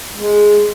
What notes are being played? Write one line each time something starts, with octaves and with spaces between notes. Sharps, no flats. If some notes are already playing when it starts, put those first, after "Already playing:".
G#3